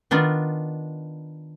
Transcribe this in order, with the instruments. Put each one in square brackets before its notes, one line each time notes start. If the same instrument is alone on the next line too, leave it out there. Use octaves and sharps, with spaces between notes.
[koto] D#3 B3 D4 F4